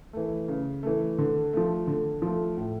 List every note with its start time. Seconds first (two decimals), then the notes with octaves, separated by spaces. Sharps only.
0.13 E3 A3
0.48 C#3
0.83 E3 A3
1.18 D3
1.53 F3 A3
1.87 D3
2.22 F3 A3
2.57 A2